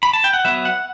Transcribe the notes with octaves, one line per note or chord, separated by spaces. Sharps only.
B5
A5
G5
F#5
F#3 B3 E5
F#5